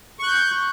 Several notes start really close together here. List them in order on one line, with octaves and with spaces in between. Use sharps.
C#6 F#6 G6